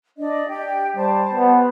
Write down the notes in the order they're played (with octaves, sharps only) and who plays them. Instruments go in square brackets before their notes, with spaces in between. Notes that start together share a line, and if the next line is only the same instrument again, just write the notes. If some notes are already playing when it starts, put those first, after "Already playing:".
[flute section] D4 D5 D#5
G4 G5
[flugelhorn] G3 [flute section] C5 A5
[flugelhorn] B3